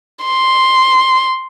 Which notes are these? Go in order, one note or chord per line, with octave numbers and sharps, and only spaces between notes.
C6